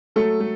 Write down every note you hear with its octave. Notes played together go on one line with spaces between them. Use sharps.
F#3 A3 A4
A3